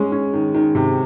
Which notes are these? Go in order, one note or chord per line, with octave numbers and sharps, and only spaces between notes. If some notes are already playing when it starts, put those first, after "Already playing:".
Already playing: G#3 C#4
C#4
D#3
D#3
C3